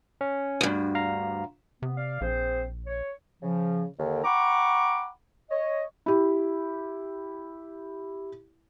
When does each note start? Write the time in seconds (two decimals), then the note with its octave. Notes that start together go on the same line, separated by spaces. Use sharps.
0.21 C#4
0.61 D2 G2
0.95 F5 A#5
1.82 C3 B3
1.97 D5 F5
2.21 A#1 C4 G#4 C5
2.87 C#5
3.42 C#3 F3
3.98 D#2 D3
4.24 F#5 G5 A#5 B5 C#6 D6
5.51 C#5 D#5
6.06 E4 G4